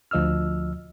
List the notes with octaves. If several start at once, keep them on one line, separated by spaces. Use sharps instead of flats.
D2 F3 D#5 E6 F6